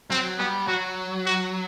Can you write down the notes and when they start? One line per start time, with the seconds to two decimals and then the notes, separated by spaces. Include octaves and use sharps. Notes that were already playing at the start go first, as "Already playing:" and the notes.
0.10 F#3 C4
0.38 G3 B3
0.67 F#3 F#4
1.26 F#4